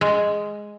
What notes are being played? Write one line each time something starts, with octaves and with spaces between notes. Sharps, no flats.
G#3